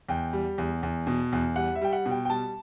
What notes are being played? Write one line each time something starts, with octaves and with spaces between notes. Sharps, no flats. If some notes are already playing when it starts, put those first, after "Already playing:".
E2 G5
G3
E2
E2
B2
E2
G3 F#5
E5
G3 G5
F#5
B2
G5
G5
G3 A5